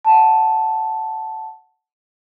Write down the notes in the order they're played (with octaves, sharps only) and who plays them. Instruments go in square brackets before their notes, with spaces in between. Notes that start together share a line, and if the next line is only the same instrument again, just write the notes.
[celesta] F#5 A5